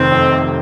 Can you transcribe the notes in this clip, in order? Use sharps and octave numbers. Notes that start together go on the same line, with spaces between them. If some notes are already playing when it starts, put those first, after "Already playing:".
Already playing: F1 D#3 C4
F2
C3